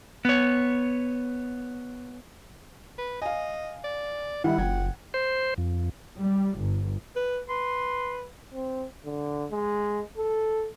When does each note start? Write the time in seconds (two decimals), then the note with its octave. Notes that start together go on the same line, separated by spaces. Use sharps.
0.25 B3 C#5
2.98 B4
3.22 D#5 F5 G#5
3.84 D5
4.44 D#3 G3 E4 F#5
4.58 F#1 F3 G5 G#6
5.14 C5
5.58 F2
6.20 G3
6.59 G1
7.16 B4
7.49 B4 C6
8.54 C4
9.05 D3
9.52 G#3
10.18 A4